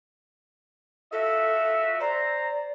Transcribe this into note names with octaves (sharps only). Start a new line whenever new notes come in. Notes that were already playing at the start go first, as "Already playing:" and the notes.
F4 F#4 A4 E5
C5 D5 A#5